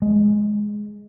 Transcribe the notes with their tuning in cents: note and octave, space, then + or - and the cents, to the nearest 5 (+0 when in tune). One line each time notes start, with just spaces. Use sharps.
G#3 +5